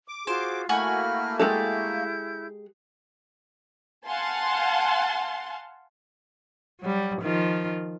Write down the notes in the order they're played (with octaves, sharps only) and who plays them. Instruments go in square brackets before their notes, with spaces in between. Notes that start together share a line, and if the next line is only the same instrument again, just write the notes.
[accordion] D6
[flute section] F4 F#4 G#4 [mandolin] C5
[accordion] A3 A#3 [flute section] E4 B5 F6 [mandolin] F#4 G#5
[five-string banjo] G#3 G4 A4 [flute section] E4 G6
[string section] F5 F#5 G#5 A5 C6
[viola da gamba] F#3 G3
D#3 F3 F4